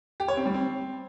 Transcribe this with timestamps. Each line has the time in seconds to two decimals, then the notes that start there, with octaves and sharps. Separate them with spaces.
0.20 G4
0.28 C#5
0.37 C4
0.46 G3
0.54 C4